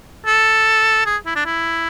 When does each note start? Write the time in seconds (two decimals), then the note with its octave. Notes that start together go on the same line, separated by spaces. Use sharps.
0.26 A4
1.06 G#4
1.26 E4
1.36 D4
1.46 E4